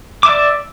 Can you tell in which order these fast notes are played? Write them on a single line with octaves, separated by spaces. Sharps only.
D6 E5 D5